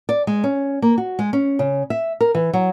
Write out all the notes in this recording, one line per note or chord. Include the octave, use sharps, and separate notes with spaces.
D5
G#3
C#4
A#3
F#4
G#3
C#4
C#3
E5
A#4
E3
F#3